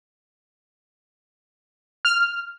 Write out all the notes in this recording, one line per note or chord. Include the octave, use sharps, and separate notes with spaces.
F6